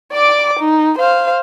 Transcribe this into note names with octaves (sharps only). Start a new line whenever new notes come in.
D5 D6
D#4
C5 F5